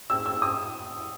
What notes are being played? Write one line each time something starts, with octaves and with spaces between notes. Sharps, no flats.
E6
E6
D#6